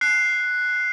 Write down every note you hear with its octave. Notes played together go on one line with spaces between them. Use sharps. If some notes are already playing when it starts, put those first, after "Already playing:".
F#6 C7